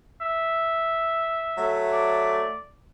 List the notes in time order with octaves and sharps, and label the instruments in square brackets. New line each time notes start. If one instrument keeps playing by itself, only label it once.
[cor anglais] E5
[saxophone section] F#3 A3
[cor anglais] D5